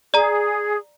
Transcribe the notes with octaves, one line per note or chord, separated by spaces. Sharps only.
G#4 D5 A#5